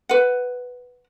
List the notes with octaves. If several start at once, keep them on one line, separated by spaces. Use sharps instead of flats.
B4 F#5